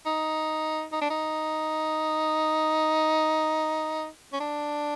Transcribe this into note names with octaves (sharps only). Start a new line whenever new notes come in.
D#4
D#4
D4
D#4
C#4
D4